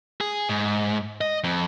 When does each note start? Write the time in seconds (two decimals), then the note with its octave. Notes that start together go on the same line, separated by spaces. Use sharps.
0.21 G#4
0.49 G#2
1.21 D#5
1.44 F2